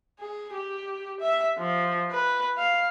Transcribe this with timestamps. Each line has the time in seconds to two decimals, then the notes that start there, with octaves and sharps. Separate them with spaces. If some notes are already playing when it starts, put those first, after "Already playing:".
0.20 G#4
0.54 G4
1.20 E5
1.58 F3
2.11 B4
2.57 F5